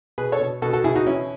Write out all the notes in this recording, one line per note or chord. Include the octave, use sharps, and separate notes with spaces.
B2 G#4 B4
A4 C#5
B2
B2 F#4 A4
F#4 A4
B2 E4 G#4
D#4 F#4
E3 C#4 E4